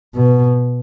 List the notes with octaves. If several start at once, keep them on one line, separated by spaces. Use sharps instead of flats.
B2